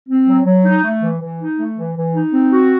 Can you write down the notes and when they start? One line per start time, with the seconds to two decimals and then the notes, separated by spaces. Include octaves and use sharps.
0.09 C4
0.27 F#3
0.46 F#3
0.64 D#4
0.84 A3
1.02 E3
1.21 E3
1.39 D#4
1.59 A3
1.77 E3
1.96 E3
2.15 D#4
2.33 C4
2.52 F#4